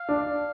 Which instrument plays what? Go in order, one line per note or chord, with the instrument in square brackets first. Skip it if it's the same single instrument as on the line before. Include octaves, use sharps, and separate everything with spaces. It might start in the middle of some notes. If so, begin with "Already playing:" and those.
Already playing: [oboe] F5
[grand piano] D4